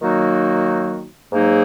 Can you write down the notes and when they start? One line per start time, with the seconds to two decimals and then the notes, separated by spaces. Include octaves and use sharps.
0.02 D#3 F#3 A#3 D#4 F#4
1.33 G#2 F#3 A#3 D#4 G#4